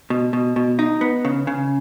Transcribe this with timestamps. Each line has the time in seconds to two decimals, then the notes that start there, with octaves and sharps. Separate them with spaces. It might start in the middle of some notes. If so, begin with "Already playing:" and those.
0.10 B2
0.33 B2
0.56 B2
0.79 D#4
1.01 B3
1.25 C#3
1.47 C#3